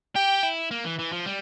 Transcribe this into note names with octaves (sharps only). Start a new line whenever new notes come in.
G4 G5
E4
A#3
E3
E3
F3
G3